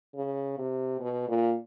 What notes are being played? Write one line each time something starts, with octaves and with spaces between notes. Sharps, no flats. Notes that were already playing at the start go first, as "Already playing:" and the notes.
C#3
C3
B2
A#2